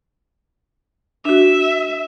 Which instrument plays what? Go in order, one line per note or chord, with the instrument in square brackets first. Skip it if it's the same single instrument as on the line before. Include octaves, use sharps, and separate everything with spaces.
[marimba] D4 F#4 [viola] E5